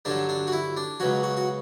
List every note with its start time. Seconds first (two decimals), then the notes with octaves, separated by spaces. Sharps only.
0.05 G2 D3 F#3 D4
0.29 D4
0.47 F#4
0.53 E4
0.77 D4
1.00 C#2 B2 F#3 F#4
1.23 F#4
1.37 F#4